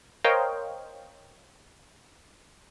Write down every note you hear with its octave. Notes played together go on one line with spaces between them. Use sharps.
A#4 C5 C#5 D#5 F5 G5